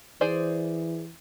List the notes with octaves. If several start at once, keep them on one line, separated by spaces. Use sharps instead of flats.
E3 G#4 C5 D5